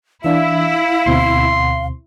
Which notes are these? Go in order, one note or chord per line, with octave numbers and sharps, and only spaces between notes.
E3 D4 E4 E5 F5
D2 B2 C4 C6